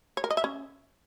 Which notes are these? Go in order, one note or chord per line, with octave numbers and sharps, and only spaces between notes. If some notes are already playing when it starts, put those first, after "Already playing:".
C#5
A#4
D#5
E5
C#4